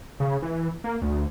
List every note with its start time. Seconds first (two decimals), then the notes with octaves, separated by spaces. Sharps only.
0.20 C#3
0.42 E3
0.84 A#3
1.02 D2